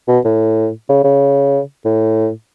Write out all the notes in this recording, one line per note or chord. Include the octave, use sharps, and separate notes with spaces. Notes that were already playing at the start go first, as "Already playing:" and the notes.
B2
A2
C#3
C#3
A2